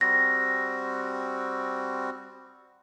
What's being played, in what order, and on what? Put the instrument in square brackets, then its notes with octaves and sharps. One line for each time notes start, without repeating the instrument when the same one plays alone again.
[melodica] G3 C4 F#4 [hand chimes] A#6